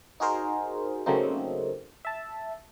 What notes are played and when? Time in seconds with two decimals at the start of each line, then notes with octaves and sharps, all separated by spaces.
0.20 D#4 F#4 G#4 A#4 C5
1.06 C#3 F#3 A3 A#3 C4 D#4
2.05 E5 A5